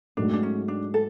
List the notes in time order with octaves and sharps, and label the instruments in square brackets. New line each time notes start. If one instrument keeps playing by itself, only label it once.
[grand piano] G#2 F#3 A3 [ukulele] D4
[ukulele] D4
C#4
D4
A4